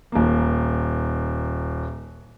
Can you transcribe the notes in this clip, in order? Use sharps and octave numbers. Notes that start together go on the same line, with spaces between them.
D#1 A#3